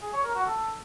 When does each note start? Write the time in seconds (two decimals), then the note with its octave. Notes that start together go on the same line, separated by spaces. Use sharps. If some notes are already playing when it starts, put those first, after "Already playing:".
0.02 G#4
0.13 C#5
0.24 A#4
0.35 F#4
0.46 A4